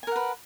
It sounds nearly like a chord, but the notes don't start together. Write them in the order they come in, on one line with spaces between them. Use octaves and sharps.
G#5 A#4 F#5 B4